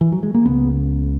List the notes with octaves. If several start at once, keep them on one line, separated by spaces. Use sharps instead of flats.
E3
F#3
G#3
A#3
C#2 C#3 B3